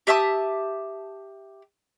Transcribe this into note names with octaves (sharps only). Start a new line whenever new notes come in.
G4 E5 A5 D#6